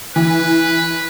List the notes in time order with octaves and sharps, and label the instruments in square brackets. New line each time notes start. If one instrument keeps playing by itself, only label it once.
[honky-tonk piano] E3 [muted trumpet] B4